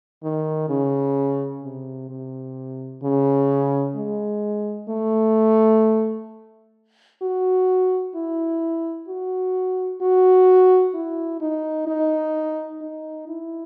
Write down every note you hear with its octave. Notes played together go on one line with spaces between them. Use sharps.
D#3
C#3
C3
C3
C#3
G#3
A3
F#4
E4
F#4
F#4
E4
D#4
D#4
D#4
E4